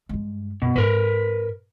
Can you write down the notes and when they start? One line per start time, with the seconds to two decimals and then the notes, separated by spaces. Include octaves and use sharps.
0.09 G2 G#3
0.62 F#2 B2 G3
0.76 G#2 C4 A#4 B4